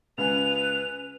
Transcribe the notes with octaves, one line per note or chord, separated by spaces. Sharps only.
C#2 B4 G#5 F7